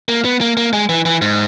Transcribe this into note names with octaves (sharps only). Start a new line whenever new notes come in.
A#3
B3
A#3
A#3
G#3
E3
E3
G#2